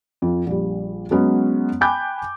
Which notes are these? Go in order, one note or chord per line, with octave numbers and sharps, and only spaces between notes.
F2
A#1 G3
F#3 G#3 B3 C#4
G5 G#5 B5 D6 F#6 G6